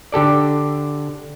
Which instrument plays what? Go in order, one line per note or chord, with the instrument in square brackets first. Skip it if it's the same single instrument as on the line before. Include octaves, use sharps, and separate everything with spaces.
[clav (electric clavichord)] D3 G4 A4 D5